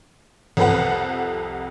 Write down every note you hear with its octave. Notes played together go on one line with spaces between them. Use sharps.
C2 F2 C3 A4 B4 F#5